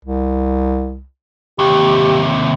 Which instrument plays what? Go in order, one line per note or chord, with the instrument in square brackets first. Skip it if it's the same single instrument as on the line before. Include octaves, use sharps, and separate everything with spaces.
[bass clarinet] C2
[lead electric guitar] D#2 C3 [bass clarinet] G4